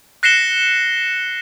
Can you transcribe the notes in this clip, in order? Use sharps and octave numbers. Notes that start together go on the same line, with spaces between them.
F#6 A#6 C7 C#7 E7 G7